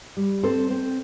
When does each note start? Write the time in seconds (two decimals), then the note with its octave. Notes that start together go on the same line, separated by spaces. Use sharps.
0.17 G3
0.43 C4 A4 C5
0.70 C4